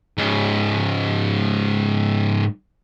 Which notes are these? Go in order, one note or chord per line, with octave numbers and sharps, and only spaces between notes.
G#2 C#3